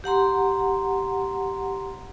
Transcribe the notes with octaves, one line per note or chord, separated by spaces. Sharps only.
G4 F#5 A#5 C6